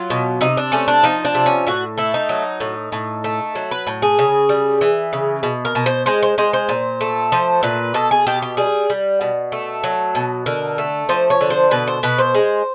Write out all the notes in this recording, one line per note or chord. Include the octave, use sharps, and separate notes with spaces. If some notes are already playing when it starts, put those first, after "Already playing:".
Already playing: F#3 F4
B2
C3 D#4
D4
A3 C#4
D4
F3 D#4
D4
C3
C#4
A2 F#4
A3 E4
D#4
F#3
A2
A2
A3
F#3
B4
A2
G#4
C#3
G3
E3
C#3
B2
A#4
B2
C5
G#3 C5
C5
G#3 C5
C5
A#2
A3
F3 C5
A#2 B4
B2 A4
G#4
B2 G4
G4
G3 G#4
G3
B2
A3
F#3
B2
D3 A#4
A3
F3 C5
C#5
D3
C5
B2 B4
C5
B2 B4
C5
G#3